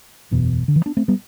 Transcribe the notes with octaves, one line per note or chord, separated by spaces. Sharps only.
F#1 E2 B2
D3
E3
B3 D4
A3 C4
G3 B3